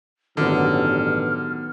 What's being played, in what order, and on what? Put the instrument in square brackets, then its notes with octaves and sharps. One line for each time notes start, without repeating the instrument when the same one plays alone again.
[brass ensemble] A1 G2 [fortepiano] D3 [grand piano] D#3 F#3 B3 [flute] F6